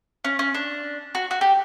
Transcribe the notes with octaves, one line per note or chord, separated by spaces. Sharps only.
C#4
C#4
D4
F#4
F#4
G4